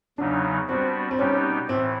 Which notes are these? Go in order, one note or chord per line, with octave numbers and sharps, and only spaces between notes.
E2 C#3 F#3 B3 D4 D#4
G3 B3 C4 D4 F#4
C4
B2 G3 B3 C#4 D#4 G4
A2 E3 C4